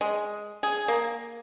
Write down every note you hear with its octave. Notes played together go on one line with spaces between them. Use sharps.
G#3
G#4
A#3